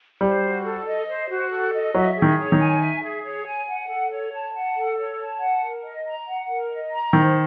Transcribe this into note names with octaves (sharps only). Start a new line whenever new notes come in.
G3 C5
F#4
A4
D#5
C5
F#4
A4
D#5
F#3 E5
G#4
D#3
C#5
D#3
G#5
E5
G#4
C#5
G#5
F#5
A4
C#5
A5
F#5
A4
C#5
A5
F#5
A#4
D#5
A#5
F#5
A#4
D#5
A#5
D#3 C5